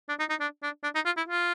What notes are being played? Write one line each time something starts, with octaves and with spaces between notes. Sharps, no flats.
D4
D#4
D#4
D4
D4
D4
D#4
F4
E4
F4